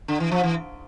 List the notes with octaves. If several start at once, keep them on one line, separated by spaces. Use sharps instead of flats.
D3
E3
F3
E3